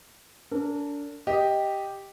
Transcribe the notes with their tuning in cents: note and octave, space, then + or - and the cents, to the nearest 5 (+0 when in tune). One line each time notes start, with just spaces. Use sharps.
D4 -30 A#4 -45
G4 +0 D#5 +0